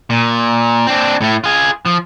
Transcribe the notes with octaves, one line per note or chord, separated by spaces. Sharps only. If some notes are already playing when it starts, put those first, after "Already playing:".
A#2
C4 D4
A2 A3
F4 G#4
F3